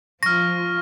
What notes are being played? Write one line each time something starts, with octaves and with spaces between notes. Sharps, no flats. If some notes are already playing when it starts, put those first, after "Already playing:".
F3 F4 C#6 F6 A#6